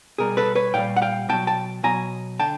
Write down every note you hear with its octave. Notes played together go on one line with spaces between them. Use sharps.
B2 G3 G#4 A#4
A4 B4
B4 C#5
A#2 G3 F5 G5
F#5
F5 G5
B2 F#3 G5 A5
G5 A5
B2 F#3 G#5 A#5
D3 G5 A5